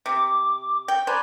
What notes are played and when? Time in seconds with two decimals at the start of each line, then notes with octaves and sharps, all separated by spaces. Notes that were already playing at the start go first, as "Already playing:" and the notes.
0.06 C3 D6
0.88 G5
1.07 B4 C5 D5 G#5 A#5